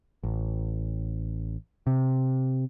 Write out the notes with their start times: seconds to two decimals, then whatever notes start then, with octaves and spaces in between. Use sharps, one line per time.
0.23 A1
1.87 C3